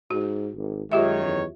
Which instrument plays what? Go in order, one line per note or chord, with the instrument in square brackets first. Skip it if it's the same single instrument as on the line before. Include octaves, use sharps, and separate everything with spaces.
[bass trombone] G#2 [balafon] F#4
[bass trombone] G#1
[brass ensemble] F#2 D#3 C#5 [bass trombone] G#3 [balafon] F4 G4 E5
[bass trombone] E2